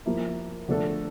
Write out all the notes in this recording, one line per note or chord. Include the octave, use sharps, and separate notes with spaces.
F3 A#3 E4
D3 F3 A3 D4 A4